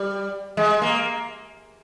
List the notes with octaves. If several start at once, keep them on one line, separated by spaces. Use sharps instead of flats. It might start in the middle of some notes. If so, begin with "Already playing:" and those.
Already playing: G3
G#3
A#3